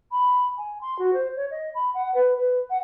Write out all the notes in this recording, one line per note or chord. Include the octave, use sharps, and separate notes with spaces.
B5
G#5
C6
F#4
C5
C#5
D#5
B5
F#5
B4
B4
F#5